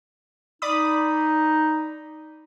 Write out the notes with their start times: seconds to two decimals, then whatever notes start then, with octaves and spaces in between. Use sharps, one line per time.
0.62 D#4 D5 B5 D#6